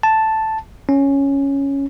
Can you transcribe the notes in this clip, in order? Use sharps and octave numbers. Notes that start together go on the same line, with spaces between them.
A5
C#4